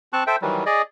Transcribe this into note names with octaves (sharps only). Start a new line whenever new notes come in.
C4 A5 C#6 F#6
A4 C5 E5 G5
D#3 E3 F#3 G3
G#4 D5 D#5